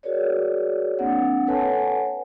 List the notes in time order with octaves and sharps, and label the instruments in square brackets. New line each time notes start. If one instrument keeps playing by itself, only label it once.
[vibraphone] F#4 G#4 A#4 C#5 D5
A#3 C4 D4 F#5
A4 B4 C#5 F#5 G#5 A5